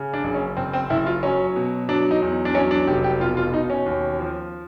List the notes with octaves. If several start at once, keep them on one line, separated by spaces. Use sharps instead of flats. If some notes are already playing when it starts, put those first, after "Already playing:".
Already playing: C#3
D4
F#1
C#4
F#1 C4
C4
F#1 E4
F4
F#3 C#4
B2
F#3 D4
D#4
E2
D4
F#3 C#4
D4
F1 G4
G4
B2 F4
F4
B2 D#4
C#4
D#2
F3